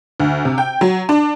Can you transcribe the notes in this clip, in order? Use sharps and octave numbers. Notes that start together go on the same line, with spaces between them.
D2
C3
G5
F#3
D4